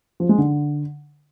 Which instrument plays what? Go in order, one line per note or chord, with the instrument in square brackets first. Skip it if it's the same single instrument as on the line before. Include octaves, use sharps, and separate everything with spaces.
[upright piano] F3
G#3
D3